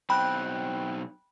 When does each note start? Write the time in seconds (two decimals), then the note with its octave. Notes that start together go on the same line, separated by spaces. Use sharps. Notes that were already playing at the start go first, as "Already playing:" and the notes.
0.10 B1 C4 G5 B5 F#6